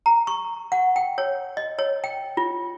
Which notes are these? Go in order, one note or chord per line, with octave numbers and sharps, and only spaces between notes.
A#5
C#6
F#5
G5
C#5
D#5
C#5
G5
F4